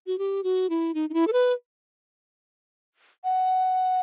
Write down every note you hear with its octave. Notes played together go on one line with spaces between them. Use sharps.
F#4
G4
F#4
E4
D#4
D#4
E4
A4
B4
F#5